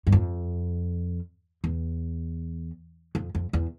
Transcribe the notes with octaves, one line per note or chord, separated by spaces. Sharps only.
G2
F2
E2
F2
F2
E2